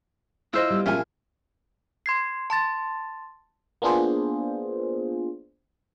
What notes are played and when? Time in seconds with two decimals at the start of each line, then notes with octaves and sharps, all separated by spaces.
0.53 E4 F4 C5 D#5 E6
0.70 G3 B3
0.86 A#1 C#4 E4 F4 F5 G#5
2.06 C6 G#6 C7
2.50 A5 C6 A6
3.82 A#3 B3 D4 F4 G#4 C5